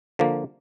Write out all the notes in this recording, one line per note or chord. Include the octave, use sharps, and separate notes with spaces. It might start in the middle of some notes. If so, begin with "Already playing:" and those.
D3 F3 A#3